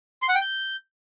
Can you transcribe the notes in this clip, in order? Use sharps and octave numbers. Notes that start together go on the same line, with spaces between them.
C6
F#5
G5
G6